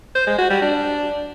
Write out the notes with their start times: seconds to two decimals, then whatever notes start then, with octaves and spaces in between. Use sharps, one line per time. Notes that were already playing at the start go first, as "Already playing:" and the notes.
0.15 C5
0.27 G#3
0.38 F#4
0.50 G3
0.62 D4